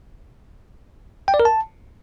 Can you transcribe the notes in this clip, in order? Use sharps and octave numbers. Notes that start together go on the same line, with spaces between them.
G5
D5
A#4
A5